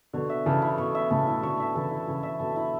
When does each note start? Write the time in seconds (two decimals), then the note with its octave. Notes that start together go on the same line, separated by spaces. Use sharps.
0.13 B2 D3 C#5
0.29 E5
0.46 C#3 E3 A4
0.62 E4
0.78 B2 C#5
0.95 E5
1.10 A2 C#3 A4
1.27 E4
1.43 B2 D3 C#5
1.60 E5
1.75 C#3 E3 A4
1.91 E4
2.07 C#3 E3 C#5
2.23 E5
2.40 B2 D3 A4
2.56 E4